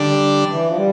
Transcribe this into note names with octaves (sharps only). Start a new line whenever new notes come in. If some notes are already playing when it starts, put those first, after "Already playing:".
Already playing: D3 G3 D4
E3
F3
G3